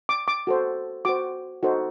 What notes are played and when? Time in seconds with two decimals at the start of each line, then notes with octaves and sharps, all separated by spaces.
0.09 D6
0.28 D6
0.47 F#4 A4 C5
1.05 F#4 C5 D6
1.63 D#4 F#4 A4 C5